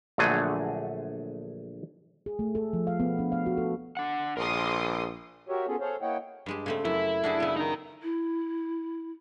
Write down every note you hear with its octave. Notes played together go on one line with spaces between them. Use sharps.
A#1 D3 F#3 A3 G#4
G#4
A3
A4
F3
F5
B3
D4
F5
F#4
A4
D4 F#5
A#1 G#4 A#4 C6 D6 D#6
F#4 G4 A#4 C#5 E5
B3 C#4 F4 G#4 A4
G#4 A4 C5 C#5 F5
A#3 E4 C#5 D#5 F#5 G5
G2 G#3 G4
C#3 A3 C4
F#2 E4
D4 F#4 G#4
C#3 B3
D#4 A#4
E4